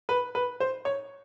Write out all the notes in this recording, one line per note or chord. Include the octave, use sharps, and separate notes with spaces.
B4
B4
C5
C#5